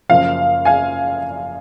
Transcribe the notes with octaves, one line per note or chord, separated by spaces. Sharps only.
F#1 F#2 F3 F5
F5 G#5